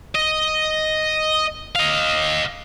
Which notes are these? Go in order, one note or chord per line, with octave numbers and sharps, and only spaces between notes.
D#5
D#5 F5